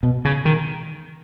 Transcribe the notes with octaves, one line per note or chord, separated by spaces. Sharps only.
B2
C#3
D#3